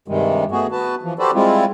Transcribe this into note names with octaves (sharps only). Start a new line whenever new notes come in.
G2 C3 D#3 G3 G#3
A3 B3 F#4 G#4
B3 F#4 B4 A5
E3 F3
F#4 G4 A4 B4 C5 D5
G3 G#3 C4 E4 F4